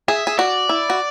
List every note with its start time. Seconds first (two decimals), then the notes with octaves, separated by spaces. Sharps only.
0.08 G#4 E5
0.27 G#4
0.38 F#4 D5
0.69 E4
0.90 F#4